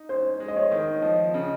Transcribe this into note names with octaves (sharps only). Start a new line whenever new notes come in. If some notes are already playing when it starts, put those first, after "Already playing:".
Already playing: D#4
C#4 C5
G#3
D#5
C#5
D#3
F3 D#5
C#3